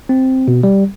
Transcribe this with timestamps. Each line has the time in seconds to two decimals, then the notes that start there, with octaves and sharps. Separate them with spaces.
0.09 C4
0.48 B2
0.63 G3